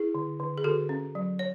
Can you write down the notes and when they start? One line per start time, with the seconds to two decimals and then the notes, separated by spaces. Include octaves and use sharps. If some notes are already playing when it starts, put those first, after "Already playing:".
Already playing: E4 G#4
0.15 D3
0.40 D3
0.58 G#4
0.64 D3 F#4 A4
0.89 C#4
1.15 F#3
1.39 C#5